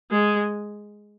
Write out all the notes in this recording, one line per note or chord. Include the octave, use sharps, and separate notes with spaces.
G#3